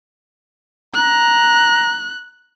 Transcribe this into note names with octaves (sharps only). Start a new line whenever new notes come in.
A#5 F#6